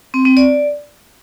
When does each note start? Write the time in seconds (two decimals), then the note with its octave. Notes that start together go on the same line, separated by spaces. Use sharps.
0.14 C4
0.25 C4
0.37 D5